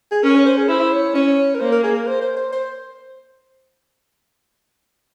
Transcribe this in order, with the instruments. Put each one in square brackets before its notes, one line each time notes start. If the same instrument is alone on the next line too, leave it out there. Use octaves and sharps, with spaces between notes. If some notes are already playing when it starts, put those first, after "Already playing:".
[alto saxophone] G#4
[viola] C#4 [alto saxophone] A#4
[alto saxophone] C#5
C5
G#4
[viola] E4 [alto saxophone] C5
[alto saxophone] C#5
[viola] C#4 [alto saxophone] C#5
[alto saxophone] A#4
[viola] A#3 [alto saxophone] C5
[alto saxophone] A#4
G#4
A#4
C5
C5
C5
C5